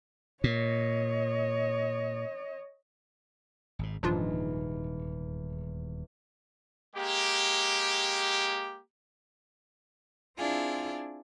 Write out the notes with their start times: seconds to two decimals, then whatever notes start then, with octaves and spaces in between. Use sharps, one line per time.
0.44 A#2 C#5 D#5
3.79 G#1 G#2
4.03 D#1 E2 G#2 F3 D4 F4
6.96 G#3 A#3 G4
10.38 C4 D4 E4 F4 G#4